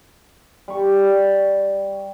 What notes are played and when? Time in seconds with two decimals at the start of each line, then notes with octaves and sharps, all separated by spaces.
0.68 G3 C#6